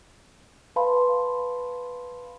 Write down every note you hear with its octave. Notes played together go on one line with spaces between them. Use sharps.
B4 F5 A5 B5 C6